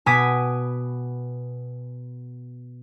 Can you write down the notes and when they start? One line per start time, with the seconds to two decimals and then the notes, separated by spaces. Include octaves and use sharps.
0.06 B2 B3 G#5 D6 D#6 B6